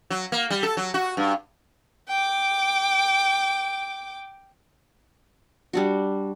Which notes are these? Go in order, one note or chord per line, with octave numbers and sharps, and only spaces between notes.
F#3
A#3
G3
A4
F#3
F#4
G2
G5 D6
G3 D4 F#4